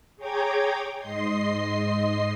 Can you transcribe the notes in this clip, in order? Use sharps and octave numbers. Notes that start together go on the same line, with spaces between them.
G#4 C#5 G5 A#5 D6 G#6
G#2 D#5 C6 C7